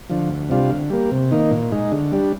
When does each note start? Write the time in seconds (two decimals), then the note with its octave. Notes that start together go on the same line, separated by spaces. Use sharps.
0.10 D3 F3
0.30 D2
0.49 C3 G3 D4 F4
0.70 D3
0.90 G3 A#3
1.11 C3
1.31 D#3 A#3 D#4
1.51 A#2
1.72 G#3 D#4
1.92 D3
2.12 G3 D4